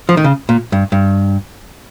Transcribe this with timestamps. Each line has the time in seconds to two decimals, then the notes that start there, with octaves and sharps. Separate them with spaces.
0.09 F3
0.17 D#3
0.24 C#3
0.49 A#2
0.72 G2
0.92 G2